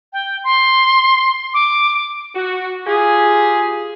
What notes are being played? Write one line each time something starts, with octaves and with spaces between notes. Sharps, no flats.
G5
C6
D6
F#4
F4 G4 G#4